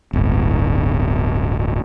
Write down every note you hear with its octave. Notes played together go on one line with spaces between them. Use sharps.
D1 G1